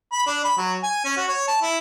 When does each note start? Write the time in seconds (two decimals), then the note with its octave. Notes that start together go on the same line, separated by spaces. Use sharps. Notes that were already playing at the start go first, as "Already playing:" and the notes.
0.13 B5
0.27 D4
0.44 B5
0.58 F#3
0.83 G#5
1.05 C#4
1.17 F#4
1.29 C#5
1.48 A5
1.62 E4